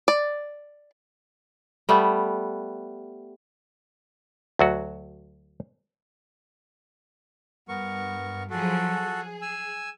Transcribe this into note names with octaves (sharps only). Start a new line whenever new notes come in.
D5
G3 A3 B3
D2 F#3 F#4
G2 B3 A#4 C#6
F3 F#3 F#4 G#4 A4
G#4
G#5 E6